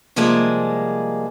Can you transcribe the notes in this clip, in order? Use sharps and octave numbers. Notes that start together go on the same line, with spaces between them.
C3 F3 G3 G#3 A#3 G#4